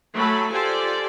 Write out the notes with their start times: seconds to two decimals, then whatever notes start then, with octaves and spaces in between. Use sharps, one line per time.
0.15 F#3 A3 A4 G#5 B5
0.51 F4 G4 A4 C5 D5 G#5